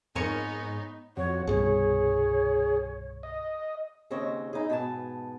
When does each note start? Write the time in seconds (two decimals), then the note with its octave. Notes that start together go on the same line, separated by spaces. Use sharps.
0.15 F2 G#2 B3 D#4 G#4 A#4 C#5 C#7
1.17 F2 F#4 C#5
1.47 C2 G2 B2 G#4 C#5
3.23 D#5
4.10 D#2 C#3 C4 C5 C#5 D#5
4.53 D#4 E4 G#4
4.69 G#2 B2 B3 D5 G#5 A5